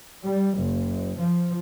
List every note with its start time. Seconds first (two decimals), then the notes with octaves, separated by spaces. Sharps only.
0.23 G3
0.57 F#1
1.18 F3